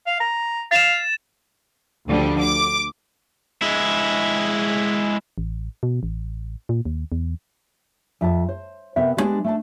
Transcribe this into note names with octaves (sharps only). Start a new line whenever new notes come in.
F5
A#5
F5 A6 E7
D2 D3 F3 G3
D6
G#3 E4
A1
B2
A1
A#2
D#2
E2
F2 E5 A5
C5
C3 B3 A#4 E5
G3 G#3 B3 C4 D4 G4
A3 D4 A5